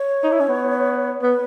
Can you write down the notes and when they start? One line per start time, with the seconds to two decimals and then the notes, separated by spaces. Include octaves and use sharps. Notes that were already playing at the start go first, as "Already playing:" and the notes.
Already playing: C#5
0.24 D#4
0.32 E4
0.40 C#4
0.48 B3
1.22 B3 B4